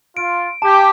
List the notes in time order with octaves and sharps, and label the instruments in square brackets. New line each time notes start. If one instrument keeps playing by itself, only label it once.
[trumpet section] F4 [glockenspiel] D7
[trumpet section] G4 [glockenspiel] A5